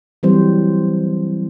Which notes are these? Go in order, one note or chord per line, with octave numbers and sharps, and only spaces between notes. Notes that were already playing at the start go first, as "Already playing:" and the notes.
E3 F#3 G3 C4 C5